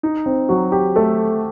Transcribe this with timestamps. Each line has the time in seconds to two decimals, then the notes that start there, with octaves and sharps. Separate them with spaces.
0.03 D#4
0.26 C4
0.49 F#3 F#4
0.72 G4
0.96 A3 A4